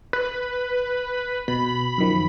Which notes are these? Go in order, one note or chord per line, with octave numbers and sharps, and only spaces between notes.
B4
B2 B5
F#2 D#3 F3